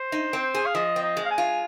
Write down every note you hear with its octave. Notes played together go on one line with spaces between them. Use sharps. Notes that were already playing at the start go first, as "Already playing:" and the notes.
Already playing: C5
D#4
C4
G#4
F5
F3 D#5
C4
D#5
G#3
F5
G#5
F4